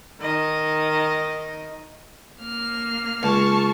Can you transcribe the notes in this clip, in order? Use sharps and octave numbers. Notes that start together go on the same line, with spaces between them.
D#3 D#5
A#3 F6
C#2 A5 C#6